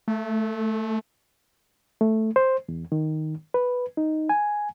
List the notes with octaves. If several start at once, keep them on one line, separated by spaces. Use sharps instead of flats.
A3
A3
C5
E2
D#3
B4
D#4
G#5